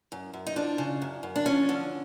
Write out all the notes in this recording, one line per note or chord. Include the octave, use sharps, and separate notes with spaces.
F#2
F#2
D#4
F3 D4
C#3
F#2
F#2
D4
F3 C#4
D3